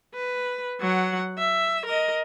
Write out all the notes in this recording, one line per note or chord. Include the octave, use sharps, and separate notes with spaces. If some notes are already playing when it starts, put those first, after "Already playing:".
B4
F#3 F#5
E5
A#4 D#5